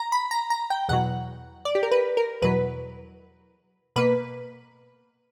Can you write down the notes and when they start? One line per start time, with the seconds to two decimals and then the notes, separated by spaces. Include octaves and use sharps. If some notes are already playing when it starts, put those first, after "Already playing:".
Already playing: A#5
0.12 B5
0.31 A#5
0.50 A#5
0.70 G5
0.89 E2 B2 F#3 F#5
1.65 D5
1.75 G4
1.83 A#4
1.92 B4
2.17 A#4
2.42 E2 B2 F#3 B4
3.96 B2 A#3 B4